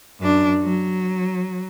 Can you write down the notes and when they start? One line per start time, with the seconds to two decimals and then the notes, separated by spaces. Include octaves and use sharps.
0.20 F#2 D4
0.62 F#3